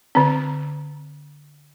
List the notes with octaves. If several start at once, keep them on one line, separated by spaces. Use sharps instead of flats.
D3 C4